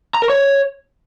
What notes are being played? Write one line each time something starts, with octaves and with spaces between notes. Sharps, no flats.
A#5
A#4
C#5